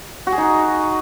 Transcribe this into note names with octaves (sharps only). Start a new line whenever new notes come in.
F#4
G#4
D#4